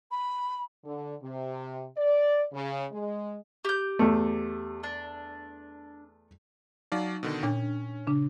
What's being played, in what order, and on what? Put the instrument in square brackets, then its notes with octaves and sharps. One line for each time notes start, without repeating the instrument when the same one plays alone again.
[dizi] B5
[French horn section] D3
C3
D5
C#3
G#3
[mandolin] G4 G6
[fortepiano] E2 A3
[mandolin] D4
[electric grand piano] F#3 D5 F5 [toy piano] D#4
[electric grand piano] B2 D3 D#3
[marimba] A#2 [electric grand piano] C#4 [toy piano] D4
[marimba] C#3 D4